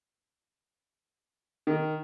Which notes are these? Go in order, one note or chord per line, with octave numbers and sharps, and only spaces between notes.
D#3